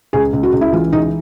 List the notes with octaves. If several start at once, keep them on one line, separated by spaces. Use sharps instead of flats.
C#2 G#4
C#2
F#4
C#2
E4
E3 F4
C#2 D#4